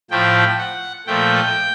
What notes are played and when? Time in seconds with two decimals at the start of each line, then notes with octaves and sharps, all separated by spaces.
0.11 A2 F3 A3 G5
0.58 F#5
1.07 A#2 F3 A3 G5